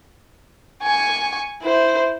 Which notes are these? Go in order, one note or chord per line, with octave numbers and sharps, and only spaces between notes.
G#5 C#6
E4 C5